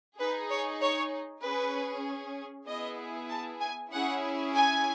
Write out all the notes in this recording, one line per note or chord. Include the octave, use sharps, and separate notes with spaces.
D#4 G#4 B4
C#5
C#5
C#4 G#4 B4
B3 E4 G#4 D#5
A5
G#5
C#4 E4 G#4 F#5
G#5